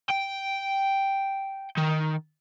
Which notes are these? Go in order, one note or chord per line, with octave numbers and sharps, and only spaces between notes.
G5
D#3